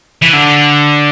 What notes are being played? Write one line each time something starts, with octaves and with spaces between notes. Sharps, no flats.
E3
D3